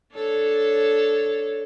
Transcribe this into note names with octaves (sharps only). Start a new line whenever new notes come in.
D4 A4 C#5